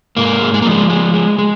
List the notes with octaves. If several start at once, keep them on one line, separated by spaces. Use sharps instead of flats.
G#2 A#3
G#3
G#3
A#3
F3
G#3
G#3
G#3
G#3